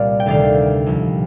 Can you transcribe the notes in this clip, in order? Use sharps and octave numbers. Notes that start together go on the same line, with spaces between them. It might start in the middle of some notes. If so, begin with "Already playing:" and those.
Already playing: C2 A#2 G3 D5 F5
G5
D2 C3 D#3 D5 F5
C2 A#2 F3